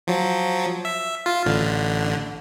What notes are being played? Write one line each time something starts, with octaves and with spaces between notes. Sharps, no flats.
F3 F#3
E5
F4
A1 D3